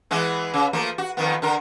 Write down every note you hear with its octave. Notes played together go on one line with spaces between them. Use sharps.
E3 G#3 B3
C#3
F3 A3 A#3
F#4
F2 D#3 B3
D3 A#4